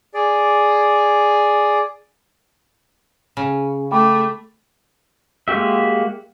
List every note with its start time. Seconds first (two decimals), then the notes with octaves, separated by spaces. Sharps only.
0.14 G#4 D5
3.37 C#3
3.91 A3 G5 B5 D6
5.48 G#3 A#3 F#4 G4 E5